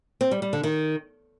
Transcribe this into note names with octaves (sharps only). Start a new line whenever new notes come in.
C4
G3
G3
D3
D#3